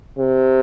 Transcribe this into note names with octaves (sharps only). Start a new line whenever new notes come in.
C3